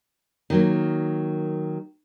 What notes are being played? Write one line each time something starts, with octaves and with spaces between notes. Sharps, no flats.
D#3 F#3 A#3